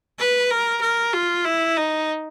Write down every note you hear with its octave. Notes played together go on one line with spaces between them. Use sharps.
B4
A#4
A#4
F4
E4
D#4